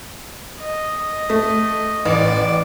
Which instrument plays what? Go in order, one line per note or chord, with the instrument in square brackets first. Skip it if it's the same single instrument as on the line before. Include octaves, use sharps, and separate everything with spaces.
[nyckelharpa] D#5
[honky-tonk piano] A3
[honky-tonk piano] A1 [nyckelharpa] D5